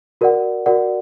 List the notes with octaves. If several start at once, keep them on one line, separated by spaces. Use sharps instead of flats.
F#4 A#4 D5 F#5
F#4 A#4 D5 F#5